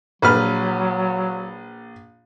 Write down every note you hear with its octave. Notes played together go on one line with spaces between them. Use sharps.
A#1 F#3 B4 F6